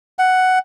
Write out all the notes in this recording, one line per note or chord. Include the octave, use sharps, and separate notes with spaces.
F#5